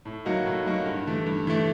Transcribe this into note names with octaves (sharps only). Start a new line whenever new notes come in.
A2
F#3 A#3 D#4 F#4
A2
F#3 A#3 D#4 F#4
G2
E3 A3
G2
E3 A3